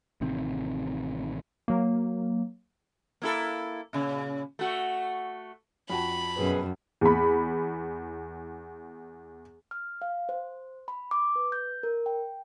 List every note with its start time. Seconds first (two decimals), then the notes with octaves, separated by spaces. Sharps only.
0.21 A1 C3 D#3 C4
1.68 F#3 A#3
3.22 A#3 E4 A4
3.93 A#2 C#3
4.59 A3 F#4
5.90 F2 F#4 A5 B5
6.37 F#2 B2 G#4 B4
7.01 E2 B5
9.71 F6
10.02 F5
10.29 C5
10.88 B5
11.11 D6
11.36 B4
11.52 G6
11.83 A#4
12.06 G5